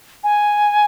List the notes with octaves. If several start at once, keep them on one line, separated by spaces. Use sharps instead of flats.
G#5